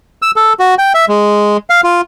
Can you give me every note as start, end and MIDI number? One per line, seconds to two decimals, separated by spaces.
0.22 0.31 88
0.36 0.53 69
0.60 0.75 66
0.78 0.93 79
0.94 1.05 76
1.09 1.57 56
1.70 1.81 77
1.84 2.01 65